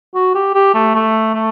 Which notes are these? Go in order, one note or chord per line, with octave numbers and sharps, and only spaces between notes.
F#4
G4
G4
A3
A3
A3